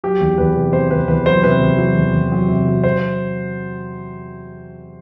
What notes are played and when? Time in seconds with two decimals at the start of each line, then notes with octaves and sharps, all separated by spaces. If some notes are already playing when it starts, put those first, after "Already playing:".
0.04 F#3 G4
0.20 E2
0.38 E2 B4
0.55 C3
0.73 C3 C5
0.91 E2 B4
1.08 E2 B4
1.26 F#3 C5
1.43 C3 B4
1.61 E2
1.78 F#3
1.97 E2
2.14 E2
2.32 F#3
2.48 C3
2.67 F#3
2.84 C5